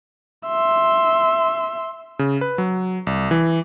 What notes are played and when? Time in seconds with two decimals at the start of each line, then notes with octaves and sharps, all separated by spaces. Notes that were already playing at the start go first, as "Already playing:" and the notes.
0.47 E5 C6
2.19 C#3
2.41 B4
2.58 F#3
3.07 C2
3.31 E3